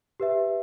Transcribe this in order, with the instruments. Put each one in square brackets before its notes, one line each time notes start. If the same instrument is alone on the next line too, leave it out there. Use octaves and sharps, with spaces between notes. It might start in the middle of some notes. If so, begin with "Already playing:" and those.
[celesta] G4 B4 E5